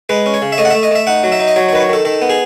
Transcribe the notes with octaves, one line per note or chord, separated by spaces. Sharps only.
G#3 B4
C#4
C#5
C#3
E5
A3 D#5
F#5
A3 E5
D#5
A3 E5
D#4 F#5
F#3
E5
D#4
D#5
F#3 C#5
C#5
D#3 B4
C#5
D#3 A4
D#3 A4
B3
G#4